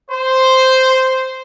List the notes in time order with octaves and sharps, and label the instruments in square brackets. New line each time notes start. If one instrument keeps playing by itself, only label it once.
[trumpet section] C5